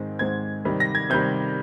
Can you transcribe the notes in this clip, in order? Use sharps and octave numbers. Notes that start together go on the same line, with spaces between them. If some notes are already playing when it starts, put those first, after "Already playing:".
Already playing: G#2 D#3 G#3 C4
G#2 D#3 G#3 C4 G#6
C3 D#3 G3
A#6
G#6
C3 D#3 G3 G6